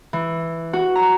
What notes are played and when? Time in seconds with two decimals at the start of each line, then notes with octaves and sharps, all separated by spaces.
0.13 E3
0.73 F#4
0.95 A#5